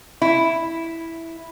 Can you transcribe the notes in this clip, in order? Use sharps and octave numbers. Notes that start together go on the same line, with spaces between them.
E4